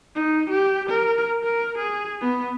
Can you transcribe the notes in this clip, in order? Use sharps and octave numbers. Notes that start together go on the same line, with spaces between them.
D#4
G4
A#4
A#4
G#4
B3